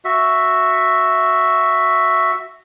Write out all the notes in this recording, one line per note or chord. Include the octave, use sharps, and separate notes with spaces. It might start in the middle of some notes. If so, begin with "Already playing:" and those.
F#4 E5